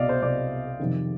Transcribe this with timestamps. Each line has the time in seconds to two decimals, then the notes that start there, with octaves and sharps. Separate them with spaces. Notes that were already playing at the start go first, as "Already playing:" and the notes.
Already playing: C2 B2 D5 D#5 F5
0.09 C5
0.22 C2 B2 D5
0.79 F2 C3 D#3